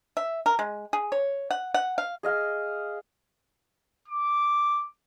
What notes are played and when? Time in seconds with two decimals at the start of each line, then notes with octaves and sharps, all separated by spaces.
0.17 E5
0.46 A#4
0.59 G#3
0.93 G#4
1.12 C#5
1.51 F#5
1.74 F#5
1.98 F5
2.23 G#4 D#5 F5
4.08 D6